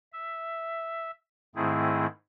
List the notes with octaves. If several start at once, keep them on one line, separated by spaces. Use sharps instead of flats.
E5
G#2 D#3 A3 C4 E4 G#4